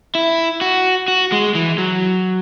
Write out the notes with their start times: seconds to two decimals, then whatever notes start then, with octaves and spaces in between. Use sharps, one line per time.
0.15 E4
0.61 F#4
1.08 F#4
1.32 G#3
1.55 E3
1.78 F#3